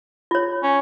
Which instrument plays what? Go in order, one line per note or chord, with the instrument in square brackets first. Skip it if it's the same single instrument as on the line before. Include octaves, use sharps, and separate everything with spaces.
[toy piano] F4 C#5
[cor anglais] C#4